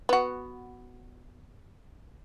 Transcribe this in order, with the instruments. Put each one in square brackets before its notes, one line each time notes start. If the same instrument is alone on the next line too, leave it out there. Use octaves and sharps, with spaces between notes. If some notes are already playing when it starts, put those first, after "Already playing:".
[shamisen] B3 F#4